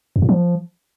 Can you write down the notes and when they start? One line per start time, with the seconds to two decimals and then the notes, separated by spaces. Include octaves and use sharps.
0.16 F2
0.22 A2
0.29 F3